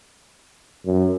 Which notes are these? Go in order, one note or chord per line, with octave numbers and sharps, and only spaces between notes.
F#2